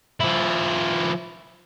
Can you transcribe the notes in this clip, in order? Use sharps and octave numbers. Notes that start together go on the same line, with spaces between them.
F3 E4